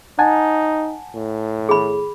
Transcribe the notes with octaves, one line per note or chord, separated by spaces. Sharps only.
D#4 F#5 G#5 A5
A2
G#4 B5